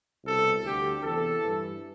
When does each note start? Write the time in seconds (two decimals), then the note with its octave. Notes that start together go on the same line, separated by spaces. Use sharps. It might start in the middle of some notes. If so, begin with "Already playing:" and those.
0.25 C2 B2 A4
0.64 D2 D3 G4
1.03 E2 C3 E3 A4
1.42 G2 E3